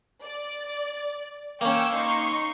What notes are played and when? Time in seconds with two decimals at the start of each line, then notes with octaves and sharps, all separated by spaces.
0.23 D5
1.61 A#3 C#4 G5 C#6 E6
1.92 D#4 C6 C#6